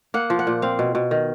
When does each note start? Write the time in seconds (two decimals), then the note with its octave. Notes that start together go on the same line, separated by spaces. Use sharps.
0.14 A#3 F#5
0.30 F3
0.39 F#5
0.47 A#2
0.62 C4 F5
0.79 B2
0.95 B2
1.11 D#3